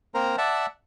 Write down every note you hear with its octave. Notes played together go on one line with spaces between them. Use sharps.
A#3 C4 A#4 C5 A#5
D5 E5 F#5 A5